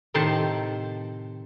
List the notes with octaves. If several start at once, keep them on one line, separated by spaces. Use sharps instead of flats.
A2 C3 D#3 C5 A5